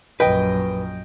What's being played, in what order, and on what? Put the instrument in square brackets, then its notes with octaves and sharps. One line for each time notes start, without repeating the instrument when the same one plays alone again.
[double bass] A#1 F#2 [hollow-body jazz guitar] B4 [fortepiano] D#5 G5